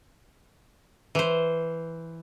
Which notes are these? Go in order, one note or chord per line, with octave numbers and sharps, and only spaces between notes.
E3 C5